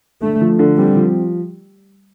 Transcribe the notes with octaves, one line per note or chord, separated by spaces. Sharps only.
D3 A3
F3
D3
G3 C4
F3